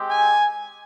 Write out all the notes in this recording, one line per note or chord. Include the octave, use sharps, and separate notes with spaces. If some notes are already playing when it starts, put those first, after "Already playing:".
Already playing: G#3 C4 G4
G#5